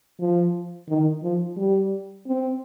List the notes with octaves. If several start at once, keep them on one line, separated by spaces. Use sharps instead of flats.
F3
D#3
F3
G3
C4